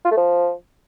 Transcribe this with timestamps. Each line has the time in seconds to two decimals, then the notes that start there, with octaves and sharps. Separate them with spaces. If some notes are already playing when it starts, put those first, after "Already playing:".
0.05 F4
0.11 A3
0.17 F3